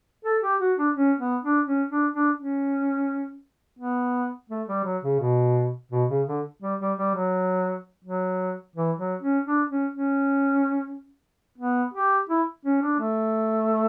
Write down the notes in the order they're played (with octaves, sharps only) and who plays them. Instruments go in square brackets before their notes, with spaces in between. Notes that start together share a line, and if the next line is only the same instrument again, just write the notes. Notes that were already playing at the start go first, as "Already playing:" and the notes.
[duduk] A4
G4
F#4
D4
C#4
B3
D4
C#4
D4
D4
C#4
B3
A3
G3
F#3
C#3
B2
B2
C#3
D3
G3
G3
G3
F#3
F#3
E3
F#3
C#4
D4
C#4
C#4
B3
G4
E4
C#4
D4
A3